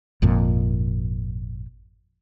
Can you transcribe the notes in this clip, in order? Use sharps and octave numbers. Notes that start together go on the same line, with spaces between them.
G#1 F2 A#2